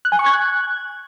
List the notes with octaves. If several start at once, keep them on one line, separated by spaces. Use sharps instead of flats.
F#6
G#5
C#6
G#6
F#6